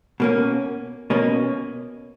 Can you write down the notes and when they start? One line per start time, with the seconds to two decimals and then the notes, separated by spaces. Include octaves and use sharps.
0.20 B2 A#3 C#4
1.10 B2 A#3 C#4